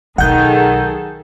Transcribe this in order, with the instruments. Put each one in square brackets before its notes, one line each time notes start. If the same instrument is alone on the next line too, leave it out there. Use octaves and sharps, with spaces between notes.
[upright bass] B1 [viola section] D#3 G#4 A4 [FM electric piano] F#5 G6